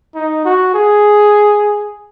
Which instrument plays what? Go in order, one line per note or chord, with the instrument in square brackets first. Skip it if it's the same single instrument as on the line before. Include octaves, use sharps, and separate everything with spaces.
[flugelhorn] D#4
F#4
G#4